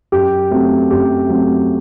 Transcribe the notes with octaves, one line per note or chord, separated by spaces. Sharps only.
F#2 G4
F#3 A3 C4
F#2 G4
F#3 A3 C4